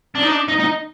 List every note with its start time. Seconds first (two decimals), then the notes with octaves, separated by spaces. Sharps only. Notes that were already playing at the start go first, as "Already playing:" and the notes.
0.15 D4
0.23 D#4
0.31 D4
0.48 D#4
0.60 D#4